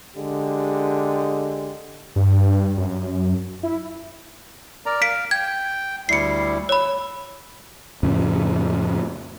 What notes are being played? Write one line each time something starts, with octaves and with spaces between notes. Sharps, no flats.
D3 G#3 G4
G2
F#2
E4
A#4 D5 A#5
F5 B6 D7
G5 G#6
D2 G3 E4 C7 C#7
C#5 B5 E6
F2 A2 C#3